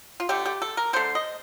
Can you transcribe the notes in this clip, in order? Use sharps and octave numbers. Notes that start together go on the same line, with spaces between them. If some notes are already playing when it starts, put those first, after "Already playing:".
F4
D3 A3 G4
G4
A4
A#4
D3 A3 C5
D#5